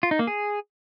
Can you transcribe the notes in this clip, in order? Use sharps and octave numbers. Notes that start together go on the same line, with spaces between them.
F4
D#4
A#3
G#4